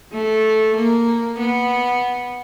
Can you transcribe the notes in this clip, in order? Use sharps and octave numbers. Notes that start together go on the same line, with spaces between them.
A3
A#3
B3